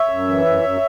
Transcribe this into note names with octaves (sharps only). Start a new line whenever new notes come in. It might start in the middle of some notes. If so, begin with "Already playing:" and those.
Already playing: C#5 E5
F#2
E3
F#2
F#2